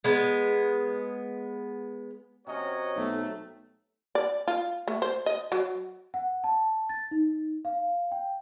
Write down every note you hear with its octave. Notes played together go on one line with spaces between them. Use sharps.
G#3 B3
C3 F#3 C#4 F#4 C#5 D#5
B1 A3
D5
F4
A3
C5
D#5
F#3
F#5
A5
A6
D#4
F5
G5